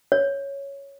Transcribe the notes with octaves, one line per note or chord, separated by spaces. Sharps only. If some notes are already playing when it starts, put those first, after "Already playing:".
C#5